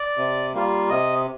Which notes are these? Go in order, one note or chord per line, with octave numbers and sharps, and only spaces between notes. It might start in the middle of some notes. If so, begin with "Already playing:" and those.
Already playing: D5
C3
G3 A#3 F4
C3 D#5